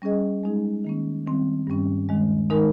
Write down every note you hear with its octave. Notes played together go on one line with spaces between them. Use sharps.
G3 C#4 G#4 D#5
G#3 D#4 G#4
D#3 A#3 C#4
D#3 G3 C4
G2 G3 C#4
D#2 D#3 G#3
D#3 G#3 D#4 A#4